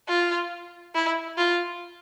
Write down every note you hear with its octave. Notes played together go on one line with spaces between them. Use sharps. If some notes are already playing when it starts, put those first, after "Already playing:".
F4
E4
F4